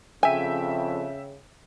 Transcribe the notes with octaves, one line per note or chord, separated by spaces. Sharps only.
F2 C#3 E5 G5 G#5